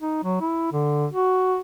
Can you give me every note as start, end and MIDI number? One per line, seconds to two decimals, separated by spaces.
0.01 0.21 63
0.24 0.38 54
0.41 0.71 64
0.72 1.06 50
1.11 1.60 66